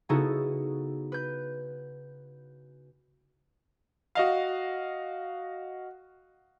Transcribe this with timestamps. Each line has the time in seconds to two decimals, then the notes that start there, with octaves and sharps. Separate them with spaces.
0.09 C#3 B3 D#4 E4 F#4 A4
1.12 B4 G6
4.15 F#4 D#5 F5